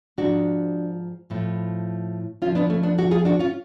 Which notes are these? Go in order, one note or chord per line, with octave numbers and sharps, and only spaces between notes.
G#2 F3 D4 F#4
A2 F3
F2 F3 C#4 F4
B3 D4
A3 C#4
B3 D4
D4 F#4
F4 G#4
D4 F#4
C#4 F4